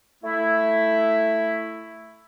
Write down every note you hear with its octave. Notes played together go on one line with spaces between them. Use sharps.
A3 E4